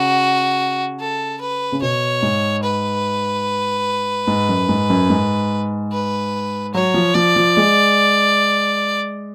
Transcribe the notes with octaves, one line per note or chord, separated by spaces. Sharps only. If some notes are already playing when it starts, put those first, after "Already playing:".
Already playing: C#3 F#4
A4
B4
C#3
B2 C#5
G#2
B4
G#2
F#2
G#2
F#2
G#2
B4
F#3 C#5
F3
F3 D5
F3
G#3